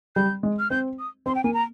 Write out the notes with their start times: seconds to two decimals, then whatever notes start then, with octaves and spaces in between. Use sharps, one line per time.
0.16 G3 G6
0.43 G#3
0.59 F6
0.70 C4 G6
0.99 D#6
1.26 C4 C6
1.35 G5
1.44 A#3 G#5
1.54 A#5